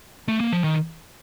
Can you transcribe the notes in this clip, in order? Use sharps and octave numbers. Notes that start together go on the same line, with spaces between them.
A3
A#3
F3
D#3